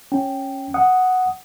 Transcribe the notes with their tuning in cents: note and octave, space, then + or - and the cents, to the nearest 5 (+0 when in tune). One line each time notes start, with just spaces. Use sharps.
C#4 -15 G5 -5
F#5 +0 D#6 +0